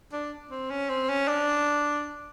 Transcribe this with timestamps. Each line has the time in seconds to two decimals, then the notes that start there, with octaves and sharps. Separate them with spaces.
0.12 D4
0.51 C4
0.70 C#4
0.89 C4
1.09 C#4
1.28 D4